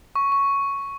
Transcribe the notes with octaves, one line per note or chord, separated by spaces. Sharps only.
C#6
C#6